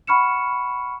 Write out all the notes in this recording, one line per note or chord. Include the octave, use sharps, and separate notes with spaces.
F#5 B5 C#6 F6 C#7 E7